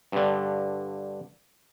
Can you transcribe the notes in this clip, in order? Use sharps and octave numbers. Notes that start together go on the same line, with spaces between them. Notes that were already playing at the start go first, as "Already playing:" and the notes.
G2 D3